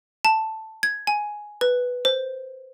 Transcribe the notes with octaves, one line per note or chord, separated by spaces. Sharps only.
A5
G#6
G#5
B4
C5